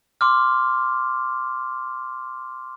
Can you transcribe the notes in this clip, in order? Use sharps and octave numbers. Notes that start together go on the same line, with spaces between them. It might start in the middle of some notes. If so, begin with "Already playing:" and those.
C6 D6 F6